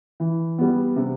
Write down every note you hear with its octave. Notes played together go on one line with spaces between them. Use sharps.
E3
G3 B3
C3